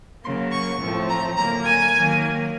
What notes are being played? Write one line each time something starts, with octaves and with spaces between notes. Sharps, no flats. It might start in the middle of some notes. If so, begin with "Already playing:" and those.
C#3 F#3 A#3 C6
C#6
A2 F3 A3 C4
A#5
D3 F#3 A#3 A#5
G#5
D#3 F#3 A#3